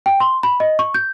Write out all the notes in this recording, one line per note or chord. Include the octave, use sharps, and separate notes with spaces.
G5
C6
B5
D#5
C#6
G6